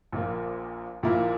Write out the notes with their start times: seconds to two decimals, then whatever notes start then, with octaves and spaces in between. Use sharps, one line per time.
0.12 A#1 A#2 A#3
1.03 A#1 A#2 A#3 E4